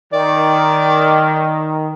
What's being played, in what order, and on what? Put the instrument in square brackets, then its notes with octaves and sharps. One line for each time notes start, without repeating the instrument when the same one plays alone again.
[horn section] D#3 [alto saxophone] D5